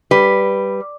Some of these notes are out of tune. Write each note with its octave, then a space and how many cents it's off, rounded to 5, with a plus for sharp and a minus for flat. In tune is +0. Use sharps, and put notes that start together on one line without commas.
G3 +0 B4 +0